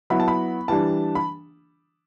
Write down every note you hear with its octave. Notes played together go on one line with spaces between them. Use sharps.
F#3 B3 E4 B5
A5
B5
E3 G3 D4 A5
B5